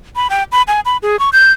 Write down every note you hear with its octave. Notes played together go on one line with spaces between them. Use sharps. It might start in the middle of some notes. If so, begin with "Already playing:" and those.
B5
G5
B5
G#5
B5
G#4
C#6
G6